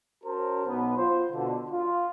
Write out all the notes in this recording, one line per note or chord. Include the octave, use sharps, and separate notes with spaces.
C#4 F#4 A#4 C5 A5
B1 B3
F4 C5
B2 D3
F4